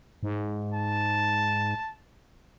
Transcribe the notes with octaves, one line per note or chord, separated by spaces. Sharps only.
G#2
A5